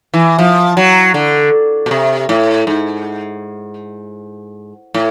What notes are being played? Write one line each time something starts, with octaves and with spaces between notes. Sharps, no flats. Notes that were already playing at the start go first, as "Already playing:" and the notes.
E3
F3
F#3
D3
B2
C3
A2
G#2
A2